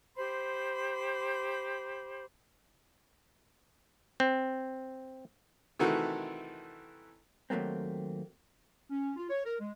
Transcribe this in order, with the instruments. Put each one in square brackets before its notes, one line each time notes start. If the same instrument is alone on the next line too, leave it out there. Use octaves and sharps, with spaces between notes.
[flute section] G4 C5 B5 C6
[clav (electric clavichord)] C4
[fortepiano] C3 D#3 E3 A3 F#4 A4
[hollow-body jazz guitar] D#2 F#3 A3 A#3 C4
[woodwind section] C#4
F4
C#5
A#4
G#3